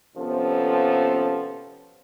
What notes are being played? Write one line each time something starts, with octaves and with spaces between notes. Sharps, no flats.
D#2 C3 F3 B3 C#4 A4